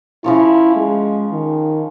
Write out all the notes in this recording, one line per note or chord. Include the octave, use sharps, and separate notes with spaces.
C#3 F3 E4 C#5
G#3
D#3